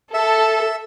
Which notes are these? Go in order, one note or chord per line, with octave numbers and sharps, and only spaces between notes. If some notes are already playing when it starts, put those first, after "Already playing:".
A4 E5